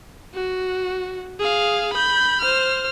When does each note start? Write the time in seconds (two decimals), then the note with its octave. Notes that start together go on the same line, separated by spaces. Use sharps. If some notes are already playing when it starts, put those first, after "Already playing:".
0.34 F#4
1.39 G#4 F5
1.93 B5 G6
2.41 C5 F6